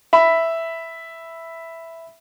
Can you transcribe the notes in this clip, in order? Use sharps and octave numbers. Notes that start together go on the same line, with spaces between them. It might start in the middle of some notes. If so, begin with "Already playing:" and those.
E5 B5